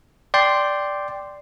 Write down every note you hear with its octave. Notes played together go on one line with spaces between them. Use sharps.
D5 G5 C6